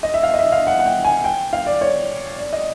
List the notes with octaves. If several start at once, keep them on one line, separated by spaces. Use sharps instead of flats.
D#5
E5
F5
D#5
E5
F5
F#5
F#5
G5
G#5
G5
F5
D5
C#5
D5
D#5